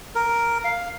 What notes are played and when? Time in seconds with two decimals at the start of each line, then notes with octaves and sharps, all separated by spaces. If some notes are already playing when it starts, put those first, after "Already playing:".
0.15 A#4
0.64 F5